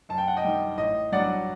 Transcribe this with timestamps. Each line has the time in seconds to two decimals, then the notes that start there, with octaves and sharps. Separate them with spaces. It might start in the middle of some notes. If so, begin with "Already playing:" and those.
0.09 F#2 A5
0.18 G5
0.28 F#5
0.37 D#5 G5
0.44 D#3 G3
0.78 A1 D#5
1.12 G2 F#3 D5 F#5